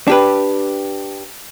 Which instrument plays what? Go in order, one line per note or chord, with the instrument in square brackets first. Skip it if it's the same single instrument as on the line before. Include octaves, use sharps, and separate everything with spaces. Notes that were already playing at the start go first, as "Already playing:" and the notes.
[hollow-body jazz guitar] D4 G4 B4